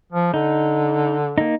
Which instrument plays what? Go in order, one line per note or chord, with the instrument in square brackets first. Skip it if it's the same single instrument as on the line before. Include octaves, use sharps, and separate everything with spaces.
[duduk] F3
[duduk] D3 [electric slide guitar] D#4
[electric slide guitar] A#3 D#4